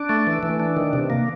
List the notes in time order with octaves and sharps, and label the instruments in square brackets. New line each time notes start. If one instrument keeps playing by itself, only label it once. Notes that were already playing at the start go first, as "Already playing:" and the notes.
Already playing: [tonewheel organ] D4
A3
E3
E3
D4
D#3
C3
A#3